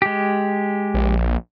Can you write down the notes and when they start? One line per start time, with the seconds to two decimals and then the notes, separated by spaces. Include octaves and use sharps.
0.02 G#3 G4
0.94 A#1